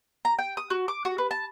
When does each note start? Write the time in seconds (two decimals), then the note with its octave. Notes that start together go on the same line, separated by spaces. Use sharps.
0.25 A#5
0.39 G5
0.57 D#6
0.70 F#4
0.88 D6
1.05 F#4
1.18 B4
1.31 A5